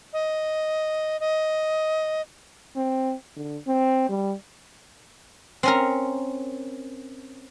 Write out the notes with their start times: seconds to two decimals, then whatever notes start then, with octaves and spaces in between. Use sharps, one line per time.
0.13 D#5
1.20 D#5
2.76 C4
3.36 D3
3.67 C4
4.09 G3
5.63 C4 C#4 A#4